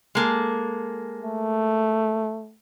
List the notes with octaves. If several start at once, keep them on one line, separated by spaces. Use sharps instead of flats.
G#3 A#3 A4
A3